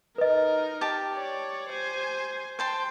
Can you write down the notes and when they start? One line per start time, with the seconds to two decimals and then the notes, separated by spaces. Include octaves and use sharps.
0.18 D#4 A#4 B4 D#5
0.81 G4 A5
1.14 C#5 D5
1.69 C5 G#5
2.59 C5 G5 A5 C6